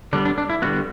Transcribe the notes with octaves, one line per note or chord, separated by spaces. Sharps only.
D3 G3 B3 D4
D4
D4
E4
D3 G3 B3 F#4